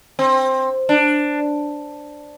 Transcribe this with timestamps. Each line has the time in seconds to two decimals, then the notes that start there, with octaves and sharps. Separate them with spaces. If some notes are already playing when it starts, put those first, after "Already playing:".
0.19 C4
0.89 D4